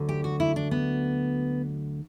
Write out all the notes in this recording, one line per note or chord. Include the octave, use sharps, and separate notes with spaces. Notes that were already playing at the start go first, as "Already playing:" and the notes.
Already playing: D2 D3 F#3
G4
F#4
E4
D4
B3